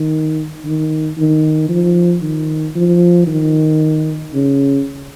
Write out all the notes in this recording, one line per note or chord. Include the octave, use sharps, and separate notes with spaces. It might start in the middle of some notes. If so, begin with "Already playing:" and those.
Already playing: D#3
D#3
D#3
F3
D#3
F3
D#3
C#3